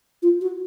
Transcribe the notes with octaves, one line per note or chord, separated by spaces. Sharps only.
F4
F#4